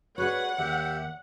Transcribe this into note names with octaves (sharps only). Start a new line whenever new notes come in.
F#4 G#4 B4 C#5 D5 F#5
D#2 G4 E5